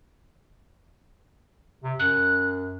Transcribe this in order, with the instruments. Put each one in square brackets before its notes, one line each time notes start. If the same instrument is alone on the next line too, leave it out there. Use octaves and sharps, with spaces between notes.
[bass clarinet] C3
[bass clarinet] F#2 [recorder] F#6